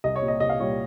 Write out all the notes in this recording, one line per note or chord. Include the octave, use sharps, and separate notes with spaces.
C2 D#5
C#5
A#2 G3
D#5
C2 D#5
F5
A#2 G3 C#5